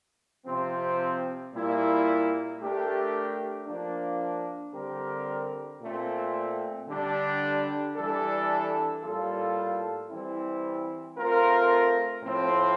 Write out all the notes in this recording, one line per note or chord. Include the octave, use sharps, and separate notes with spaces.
C3 F3 C4
A#2 G3 A#3 E4
A3 D4 G4 A#4
F3 A#3 D4
D3 G3 C4 G4 A#4
A#2 A3 C4
D3 G3 D4 G4
E3 G3 D4 A4
A2 G3 A#3 F4 A4
E3 G3 C4 E4
A3 C4 F4 A#4
A2 F3 C4